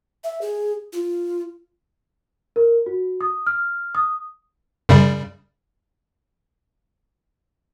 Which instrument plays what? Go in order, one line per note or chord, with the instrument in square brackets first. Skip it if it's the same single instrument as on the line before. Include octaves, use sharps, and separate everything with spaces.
[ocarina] E5
G#4
F4
[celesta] A#4
F#4
D#6
F6
D#6
[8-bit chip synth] F#2 C#3 G3